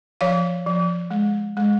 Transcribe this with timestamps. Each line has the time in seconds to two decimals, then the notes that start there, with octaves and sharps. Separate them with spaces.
0.21 F3 C#5 F5
0.66 F3
1.11 G#3
1.57 G#3